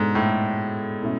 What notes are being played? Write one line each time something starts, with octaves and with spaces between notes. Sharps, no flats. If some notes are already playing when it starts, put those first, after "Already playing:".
Already playing: G#2 B2 G#3 D4 A4
A2
B2 A3 C#4 E4